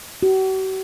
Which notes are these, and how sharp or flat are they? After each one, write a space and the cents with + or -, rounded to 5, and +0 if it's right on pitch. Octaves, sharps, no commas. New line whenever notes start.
F#4 +45